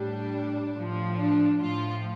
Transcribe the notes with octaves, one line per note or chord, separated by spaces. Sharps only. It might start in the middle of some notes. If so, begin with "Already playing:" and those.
Already playing: A2 G3 D4
A2 F3
D4
A2 F3 F4